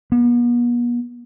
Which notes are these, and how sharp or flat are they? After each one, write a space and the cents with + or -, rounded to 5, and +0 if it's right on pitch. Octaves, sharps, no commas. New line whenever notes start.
B3 -45